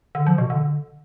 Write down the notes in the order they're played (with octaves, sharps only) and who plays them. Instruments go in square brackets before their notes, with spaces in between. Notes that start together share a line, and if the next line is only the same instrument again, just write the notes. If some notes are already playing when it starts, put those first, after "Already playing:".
[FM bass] D3
F3
B2
D3